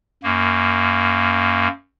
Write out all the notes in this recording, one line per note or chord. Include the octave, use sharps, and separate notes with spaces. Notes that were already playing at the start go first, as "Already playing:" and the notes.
F#2 A#3